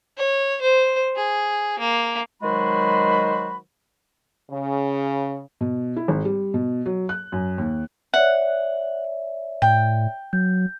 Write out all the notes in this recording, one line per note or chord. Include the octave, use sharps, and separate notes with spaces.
C#5
C5
G#4
A#3
D#3 F#3 G#3 F#4 C5 B5
C#3
B2
E4
G#1
G3
B2
F#3
F#6
F#2
D#2
C#5 D5 E5 F#5
A2 G5
F#3 G6